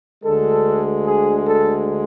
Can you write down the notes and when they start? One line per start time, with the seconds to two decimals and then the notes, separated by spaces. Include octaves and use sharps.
0.24 D2 D3 G#3 A4
1.07 G#4
1.48 A4